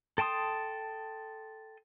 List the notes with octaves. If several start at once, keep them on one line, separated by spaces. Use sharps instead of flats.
A4 G5 A5 C6 D#6